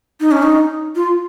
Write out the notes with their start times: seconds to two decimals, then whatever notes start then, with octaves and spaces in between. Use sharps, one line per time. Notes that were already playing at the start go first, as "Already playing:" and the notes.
0.20 D#4
0.32 C#4
0.42 D#4
0.96 F4